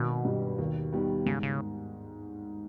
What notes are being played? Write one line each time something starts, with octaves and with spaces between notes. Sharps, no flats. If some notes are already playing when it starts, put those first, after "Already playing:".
Already playing: G#1 B2
G2 G3
D#2
D#3 G3 B3
G#2 C#3
C#3